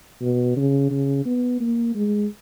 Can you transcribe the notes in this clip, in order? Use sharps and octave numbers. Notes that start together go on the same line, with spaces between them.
B2
C#3
C#3
B3
A#3
G#3